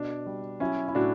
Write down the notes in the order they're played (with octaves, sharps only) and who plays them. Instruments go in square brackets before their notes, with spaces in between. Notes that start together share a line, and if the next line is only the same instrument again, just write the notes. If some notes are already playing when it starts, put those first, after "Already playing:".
Already playing: [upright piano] B2 D4
G3
F#3 C#4 E4
E4
A2 D4 F#4